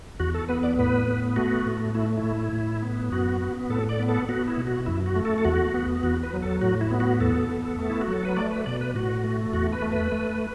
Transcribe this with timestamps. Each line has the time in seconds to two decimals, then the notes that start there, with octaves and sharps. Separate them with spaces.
0.19 E2 F#4
0.34 A4
0.49 B3 B4
0.63 D5
0.79 A2 B4
1.08 B3
1.36 A3 F#4
1.66 A2
1.95 A3 E4
2.17 E4
2.24 A2
2.53 A2
2.82 B3
3.11 F#2 F#4
3.41 B3
3.70 A2 A4
3.89 D5
3.99 B3
4.09 A4
4.29 B3 F#4
4.48 E4
4.58 B2
4.67 F#4
4.86 F#2 E4
5.06 F#4
5.15 A3
5.25 A4
5.38 A4
5.45 E2 F#4
5.74 B3
6.03 E2 F#4
6.23 B4
6.33 F#3
6.42 A4
6.61 A2 F#4
6.81 E4
6.91 B3
7.00 F#4
7.20 E2 A4
7.49 B3
7.78 A3
7.90 E4
8.01 F#4
8.08 F#3
8.13 A4
8.25 B4
8.36 A3 D5
8.51 B4
8.66 B2 D5
8.81 B4
8.95 A2 F#4
9.24 A3
9.53 E2 F#4
9.73 B4
9.82 A3
9.92 B4
10.12 A3